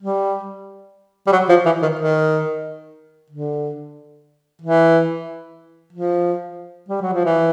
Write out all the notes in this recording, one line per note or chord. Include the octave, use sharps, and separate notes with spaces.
G3
G3
F#3
F3
E3
D#3
D#3
D3
E3
F3
G3
F#3
F3
E3